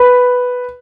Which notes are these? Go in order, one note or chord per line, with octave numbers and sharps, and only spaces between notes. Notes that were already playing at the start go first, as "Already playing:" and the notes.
Already playing: B4